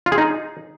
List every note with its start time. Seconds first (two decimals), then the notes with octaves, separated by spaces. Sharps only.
0.06 F4
0.12 G#4
0.18 D#4